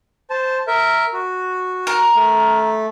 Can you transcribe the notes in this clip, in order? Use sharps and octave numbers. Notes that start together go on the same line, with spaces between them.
C5 A5
A#4 E5
F#4
A#4
A3